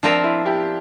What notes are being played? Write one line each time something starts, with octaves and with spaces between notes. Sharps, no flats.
F3 C4 D4 F4 A#4 E5
E4
E4 G4